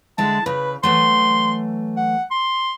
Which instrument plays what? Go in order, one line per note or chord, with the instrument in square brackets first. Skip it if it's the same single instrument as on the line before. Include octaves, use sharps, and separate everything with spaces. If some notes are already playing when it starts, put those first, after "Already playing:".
[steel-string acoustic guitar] D3 G#3 E4 [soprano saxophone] A5
[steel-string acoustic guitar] C#3 [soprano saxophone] B4
[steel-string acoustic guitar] E3 F#3 A3 [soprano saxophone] C6
[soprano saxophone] F#5
C6